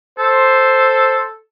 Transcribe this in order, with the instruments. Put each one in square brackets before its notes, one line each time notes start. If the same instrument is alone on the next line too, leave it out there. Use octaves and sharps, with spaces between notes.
[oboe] A4 [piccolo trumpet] C5